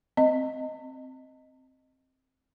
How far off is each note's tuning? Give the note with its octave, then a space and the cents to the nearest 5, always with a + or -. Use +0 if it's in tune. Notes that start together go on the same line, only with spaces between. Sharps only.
C4 +0 D#5 +0